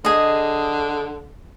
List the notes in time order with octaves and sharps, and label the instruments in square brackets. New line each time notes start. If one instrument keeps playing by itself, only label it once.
[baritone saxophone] D3 [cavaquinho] G#4 D#5